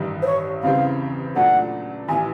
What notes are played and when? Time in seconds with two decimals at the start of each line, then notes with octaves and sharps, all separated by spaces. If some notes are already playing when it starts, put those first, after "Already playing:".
Already playing: A1 G2 D#3
0.22 C5
0.26 C#5
0.63 E2 C#3 E3 G3 C4 F5
1.36 A#2 F#3 A3 D4 F#5
2.09 A1 G#5
2.12 E3